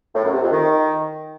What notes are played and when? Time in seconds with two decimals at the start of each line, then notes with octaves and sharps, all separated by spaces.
0.15 A2
0.24 F#2
0.33 C3
0.42 F2
0.51 D#3